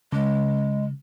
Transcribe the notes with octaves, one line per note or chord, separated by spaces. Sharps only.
C#3 G#3